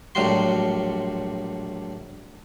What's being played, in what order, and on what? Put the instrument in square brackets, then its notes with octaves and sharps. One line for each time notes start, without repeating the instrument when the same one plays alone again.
[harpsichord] A#1 A2 F#3 G3 F#4 C6